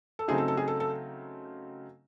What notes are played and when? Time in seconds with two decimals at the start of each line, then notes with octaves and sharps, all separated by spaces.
0.19 A4
0.28 C#3 F#3 A3 C4 D#4 G#4
0.38 A4
0.48 A4
0.57 G#4
0.68 A4
0.80 A4